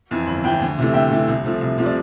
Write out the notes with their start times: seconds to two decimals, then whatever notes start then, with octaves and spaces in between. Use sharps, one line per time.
0.11 F2 E3
0.27 G1 B5
0.43 F2 E3 G5 B5
0.61 D2
0.78 C3 E3 A3
0.94 D2 E5 G5
1.11 C3 E3 A3
1.28 C2
1.44 C3 F3 A3
1.61 C2
1.78 C3 F3 A3
1.86 D5